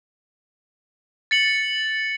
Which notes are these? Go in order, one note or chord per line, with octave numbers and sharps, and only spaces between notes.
A6 C#7 F#7